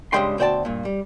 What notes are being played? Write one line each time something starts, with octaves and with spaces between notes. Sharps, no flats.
G2 C#3 G3 G#3 G5 C6
D2 B2 C5 D5 G5 A5
G2 A#2
G3